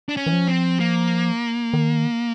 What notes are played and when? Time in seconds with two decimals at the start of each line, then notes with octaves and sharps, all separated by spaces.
0.09 D4
0.17 C#4
0.26 E3
0.33 F3
0.48 C4
0.80 A#3
1.73 D#3